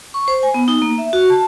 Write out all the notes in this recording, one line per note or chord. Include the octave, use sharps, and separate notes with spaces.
C#6
C5
G#5
B3
D#4
A#3
E5
F#4
A5